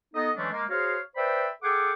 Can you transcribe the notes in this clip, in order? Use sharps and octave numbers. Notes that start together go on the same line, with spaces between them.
B3 D#4 A4 D#5
E3 F#3 G#3 A3 C#4 D4
G#3 A#3
F#4 G#4 C5 C#5 F5
B4 C5 D5 E5 G5 B5
G#4 A4 F#5 G5 D6